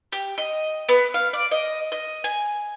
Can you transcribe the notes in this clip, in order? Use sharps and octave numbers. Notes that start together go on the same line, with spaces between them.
G4
D#5
B3
F5
D5
D#5
D#5
G#5